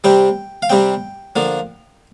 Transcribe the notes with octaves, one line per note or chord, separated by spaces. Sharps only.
C3 G3 C4 G5
F5
C3 G3 C4 G5
D3 F3 A#3